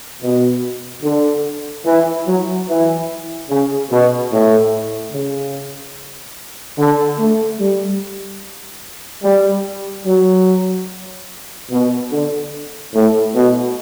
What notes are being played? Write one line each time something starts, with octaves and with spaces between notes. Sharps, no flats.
B2
D3
E3
F#3
E3
C#3
B2
A2
C#3
D3
A3
G3
G3
F#3
B2
D3
A2
B2